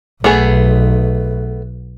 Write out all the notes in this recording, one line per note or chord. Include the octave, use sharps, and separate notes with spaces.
B1 A3 B3 G#4